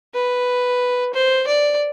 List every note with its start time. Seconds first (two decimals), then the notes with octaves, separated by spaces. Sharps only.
0.14 B4
1.14 C5
1.47 D5